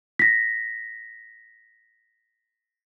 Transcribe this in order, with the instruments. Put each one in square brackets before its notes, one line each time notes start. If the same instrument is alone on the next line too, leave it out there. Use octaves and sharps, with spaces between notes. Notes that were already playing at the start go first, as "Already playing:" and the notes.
[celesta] A#6 B6